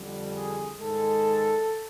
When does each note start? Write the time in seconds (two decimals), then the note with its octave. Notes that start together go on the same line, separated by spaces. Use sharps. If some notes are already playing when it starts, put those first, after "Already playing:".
Already playing: F2 D3 G3
0.35 G#4
0.80 G#2 D#3 G#3 A4